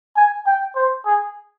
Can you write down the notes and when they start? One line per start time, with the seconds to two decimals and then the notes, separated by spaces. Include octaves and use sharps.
0.16 G#5
0.46 G5
0.75 C5
1.06 G#4